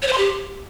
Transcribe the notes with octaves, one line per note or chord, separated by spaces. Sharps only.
C#5
C5
C6
G4